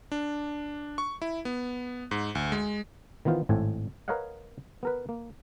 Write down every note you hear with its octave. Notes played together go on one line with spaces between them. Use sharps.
D4
C#6
E4
B3
G#2
D2
G#3
D#3 E3 B3 F4 C5
G#1 A2 C4 A4 G#5
A#4 B4 C#5 D#5 F5 F#5
B3 A#4 B4
A#3